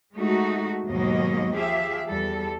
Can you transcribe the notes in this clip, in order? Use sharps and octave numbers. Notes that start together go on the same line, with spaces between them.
G#3 A3 D#4 F#4
D#2 G#2 B2 F#3 A#3 D#5
F3 G4 G#4 E5 F5
E2 G3 A4